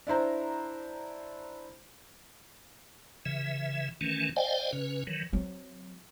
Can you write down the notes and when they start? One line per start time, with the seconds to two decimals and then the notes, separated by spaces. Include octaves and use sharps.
0.07 D4 E4 C5 A#5
3.26 C#3 E3 E5
4.01 D#3 E3 A3 C#4
4.36 C5 D5 D#5 F5 G5 G#5
4.73 C#3 C#4 B4
5.07 D#3 E3 F#3
5.33 F#3 C4